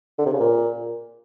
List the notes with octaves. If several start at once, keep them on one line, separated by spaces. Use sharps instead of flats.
D3
C3
C#3
A#2